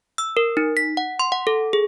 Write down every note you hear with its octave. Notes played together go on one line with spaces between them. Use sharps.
E6
A#4
D#4
B6
F#5
C6
F#5
A4
G#4